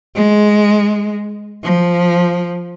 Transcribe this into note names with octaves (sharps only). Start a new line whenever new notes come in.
G#3
F3